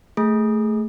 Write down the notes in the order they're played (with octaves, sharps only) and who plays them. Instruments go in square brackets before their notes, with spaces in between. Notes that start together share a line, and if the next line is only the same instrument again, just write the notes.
[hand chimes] A3 G#4